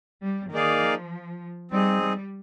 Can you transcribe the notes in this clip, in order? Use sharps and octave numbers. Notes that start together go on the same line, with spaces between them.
G3
D#3 A#3 D#4 G#4 D5 F5
F3
G3 C4 D#4 G#4
G3